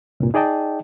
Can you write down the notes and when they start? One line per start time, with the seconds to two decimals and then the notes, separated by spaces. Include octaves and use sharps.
0.20 C2 G2 A#2
0.34 D#4 G#4 D5 D#5 G5 A5